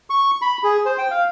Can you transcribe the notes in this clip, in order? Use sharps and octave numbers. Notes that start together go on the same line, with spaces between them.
C#6
B5
G#4
C5
G5
F5